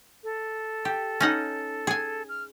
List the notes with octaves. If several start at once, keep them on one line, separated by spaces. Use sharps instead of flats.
A4
G4
C#4 D#4 F#5
G#4 G#5
F6